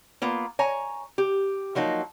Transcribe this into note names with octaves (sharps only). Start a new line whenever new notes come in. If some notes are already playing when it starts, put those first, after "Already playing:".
A#3 B3 F4
C#5 G#5 A#5
G4
F3 F#3 A#3 D#4